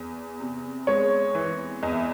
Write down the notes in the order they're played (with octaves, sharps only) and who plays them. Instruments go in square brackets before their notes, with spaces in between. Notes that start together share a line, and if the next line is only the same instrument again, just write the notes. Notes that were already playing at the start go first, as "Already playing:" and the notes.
Already playing: [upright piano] E2
C3
[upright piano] G#3 [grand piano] C#5
[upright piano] E3
[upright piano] E2 [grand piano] D#5
[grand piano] E5